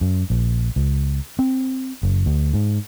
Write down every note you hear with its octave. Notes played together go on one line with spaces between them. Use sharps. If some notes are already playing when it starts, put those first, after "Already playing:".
F#2
A#1
C#2
C4
F#1
D2
G#2